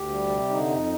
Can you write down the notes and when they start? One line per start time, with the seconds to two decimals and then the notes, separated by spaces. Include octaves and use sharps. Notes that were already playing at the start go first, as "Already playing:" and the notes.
Already playing: D2 G4
0.09 G3
0.29 C3
0.49 D3 D#4
0.69 F2